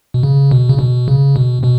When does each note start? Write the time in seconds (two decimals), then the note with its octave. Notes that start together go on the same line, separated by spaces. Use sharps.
0.14 B2
0.23 C#3
0.51 B2
0.69 C#3
0.79 B2
1.08 C#3
1.36 B2
1.64 B2